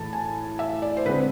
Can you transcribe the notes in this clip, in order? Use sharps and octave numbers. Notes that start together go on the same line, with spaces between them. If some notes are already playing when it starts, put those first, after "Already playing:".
Already playing: A2 E3 A3 A5
G#5
E5
D5
C5
D3 G#3 C4 B4